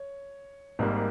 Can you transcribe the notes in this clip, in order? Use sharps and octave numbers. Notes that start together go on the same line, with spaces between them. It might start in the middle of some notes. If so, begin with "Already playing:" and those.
Already playing: C#5
G#1 G#2 G3 A#3